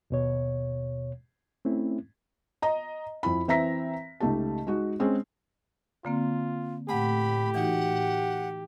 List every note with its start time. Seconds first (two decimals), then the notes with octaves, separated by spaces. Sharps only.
0.10 D#2 B2 C#5
1.65 A3 C4 C#4 E4
2.62 D#5 A#5
3.23 F2 E4 B5
3.48 E3 C4 E5 A#5 A#6 B6
4.20 C#2 A3 D#4 G4 A5
4.67 G#3 D#4 F#4
5.00 G#3 C4 C#4 G#4
6.05 D3 A#3 C4 F4
6.89 A2 A3 G4 F#5 B5
7.55 E3 D#4 F#4 F#5